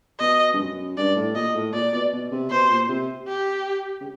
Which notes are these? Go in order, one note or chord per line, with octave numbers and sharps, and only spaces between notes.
B2 D#5
G2
F#2
G2 D5
A2
A#2 D#5
A2
A#2 D5
B2
B2
C3
B2 C5
A#2
C3
G4
C#3